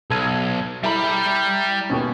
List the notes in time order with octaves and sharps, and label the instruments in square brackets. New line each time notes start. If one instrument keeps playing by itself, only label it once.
[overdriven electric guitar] B1 [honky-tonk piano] A4 G#6 D#7
[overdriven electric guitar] G3 B5 [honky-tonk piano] E4 A4 A#5
[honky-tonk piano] D#2 B2 C#4